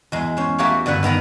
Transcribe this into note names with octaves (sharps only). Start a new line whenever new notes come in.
E2 G#3
C#4 C5
A3 A#3 F#4 G4 C#5
G2 D3 B4 F#5 G#5
D#3 B3 A#4 A#5